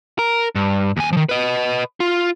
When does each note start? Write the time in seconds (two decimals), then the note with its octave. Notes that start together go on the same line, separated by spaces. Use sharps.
0.19 A#4
0.55 G2
0.97 D#2 G#5
1.13 D#3 F3
1.29 B4 D#5
2.00 F4